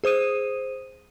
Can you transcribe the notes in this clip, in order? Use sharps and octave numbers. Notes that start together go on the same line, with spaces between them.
G#4 C5 D#6 D#7